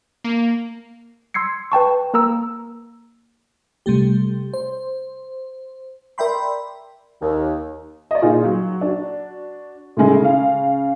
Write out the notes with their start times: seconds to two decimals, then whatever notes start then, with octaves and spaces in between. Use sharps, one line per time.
0.24 A#3
1.34 C6 E6 G#6 C7 C#7
1.72 B4 G5 A5 C#6
2.14 A#3 A#4 A#5 E6
3.86 C3 G3 A3 G4
4.54 C5
6.18 A#4 D5 E5 G5 B5 C6
7.22 D#2
8.11 D5 D#5
8.22 A#2 D#4 F4 G#4
8.45 F#3
8.81 D4 F#4
9.97 A2 C#3 G#3 E4
10.21 C#3 F5